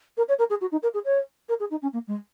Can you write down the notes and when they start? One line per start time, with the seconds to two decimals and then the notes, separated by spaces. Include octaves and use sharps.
0.17 A#4
0.28 C#5
0.38 A#4
0.49 G#4
0.61 F#4
0.71 D#4
0.82 A#4
0.94 G#4
1.04 C#5
1.48 A#4
1.59 G#4
1.70 D#4
1.82 C#4
1.93 A#3
2.07 G#3